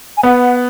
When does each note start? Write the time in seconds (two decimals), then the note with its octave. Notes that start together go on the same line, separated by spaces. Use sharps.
0.17 G#5
0.23 B3 F#5